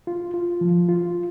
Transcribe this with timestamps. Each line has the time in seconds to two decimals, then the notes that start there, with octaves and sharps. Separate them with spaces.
0.07 F4
0.34 F4
0.61 F3
0.89 F4